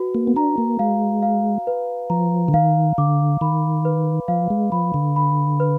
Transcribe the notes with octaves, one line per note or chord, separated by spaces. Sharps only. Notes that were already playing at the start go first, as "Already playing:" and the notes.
Already playing: F#4 B4
A#3
B3
D4 A#5
A#3
G#3 F5
F5
B4
F3 A#5
D3
D#3 F5
D3 D6
D#3 B5
B4
F3 F5
G#3
F3 B5
D3
B5
B4